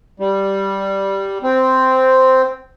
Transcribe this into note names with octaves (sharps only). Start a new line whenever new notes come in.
G3
C4